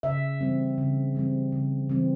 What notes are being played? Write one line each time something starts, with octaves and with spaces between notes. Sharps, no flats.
C#3 E5
E3 G3 C4
C#3
E3 G3 C4
C#3
E3 G3 C4